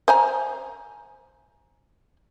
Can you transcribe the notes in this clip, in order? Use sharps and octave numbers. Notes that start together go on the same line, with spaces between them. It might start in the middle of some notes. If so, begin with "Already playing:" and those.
C5 G#5 A#5